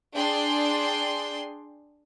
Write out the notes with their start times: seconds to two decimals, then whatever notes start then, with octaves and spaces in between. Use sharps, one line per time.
0.15 D4 G#4 G5 C6